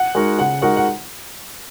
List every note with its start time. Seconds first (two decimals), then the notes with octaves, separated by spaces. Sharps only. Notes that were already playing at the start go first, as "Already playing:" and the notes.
Already playing: F#5
0.15 G#3 D#4 F#4 A#4
0.38 C#3 F#5
0.62 G#3 D#4 F#4 A#4 F#5
0.76 F#5